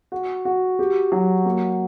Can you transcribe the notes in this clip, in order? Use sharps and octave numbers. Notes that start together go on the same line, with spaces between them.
F#4
F#4
G4
F#3
A#3